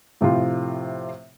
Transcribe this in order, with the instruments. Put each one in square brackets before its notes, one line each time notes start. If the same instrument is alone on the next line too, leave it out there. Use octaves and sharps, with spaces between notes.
[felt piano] A2 C3 F3 F4 G4